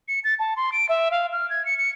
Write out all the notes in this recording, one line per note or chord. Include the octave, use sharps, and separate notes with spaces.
C#7
A6
A5
C6
D7
E5
F5
F6
G#6
C#7
C#7